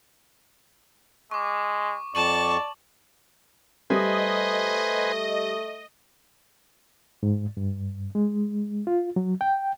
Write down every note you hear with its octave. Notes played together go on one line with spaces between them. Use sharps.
G#3 C#6 D6
F2 D5 A5 C#6 F#7
G3 A3 B4 C5 D#5 G#5
G#2
G2
G#3
F4
F#3
G5